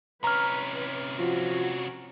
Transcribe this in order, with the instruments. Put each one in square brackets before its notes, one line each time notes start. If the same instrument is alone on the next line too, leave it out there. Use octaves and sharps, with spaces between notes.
[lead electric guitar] C3 C#4 [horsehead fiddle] B4 [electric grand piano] A#5 F6
[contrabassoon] F3 [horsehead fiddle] F#4